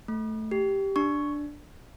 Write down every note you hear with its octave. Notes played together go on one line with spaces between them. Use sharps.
A3
G4
D4 C#6